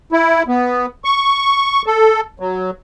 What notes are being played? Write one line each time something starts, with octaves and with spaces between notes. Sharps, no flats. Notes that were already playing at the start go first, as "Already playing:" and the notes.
E4
B3
C#6
A4
F#3